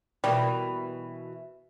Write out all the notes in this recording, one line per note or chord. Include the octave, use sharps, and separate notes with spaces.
B2 E3 G3 A#3